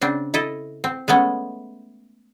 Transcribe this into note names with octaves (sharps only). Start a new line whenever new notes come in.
C#3 C4 D4
E4 A4 D#5
C4
G#3 A3 B3 C#4